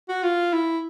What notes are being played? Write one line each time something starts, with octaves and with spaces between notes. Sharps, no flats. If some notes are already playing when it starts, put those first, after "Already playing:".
F#4
F4
E4